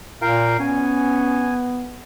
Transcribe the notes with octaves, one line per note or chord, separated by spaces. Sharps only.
A#2 F4 A#4 F5 G5
B3 C#4 G#5